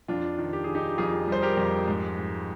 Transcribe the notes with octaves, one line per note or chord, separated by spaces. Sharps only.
F2 D4 F4
D#3
G4
D#3 G#4
D#4 G4
F2 F4 G#4
G3 C5
G4 A#4
F2
G#2
G#2